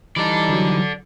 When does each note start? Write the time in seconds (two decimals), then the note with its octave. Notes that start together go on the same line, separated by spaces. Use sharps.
0.16 E3 G3 D#4 A4 D5
0.49 D3 F#3